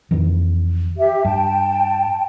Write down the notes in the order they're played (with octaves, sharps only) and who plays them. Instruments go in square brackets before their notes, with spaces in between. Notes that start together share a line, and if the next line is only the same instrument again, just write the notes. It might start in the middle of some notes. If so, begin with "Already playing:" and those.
[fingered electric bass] F2 D#3 E3
[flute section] G4 E5
[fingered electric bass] G2 [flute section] G5 A5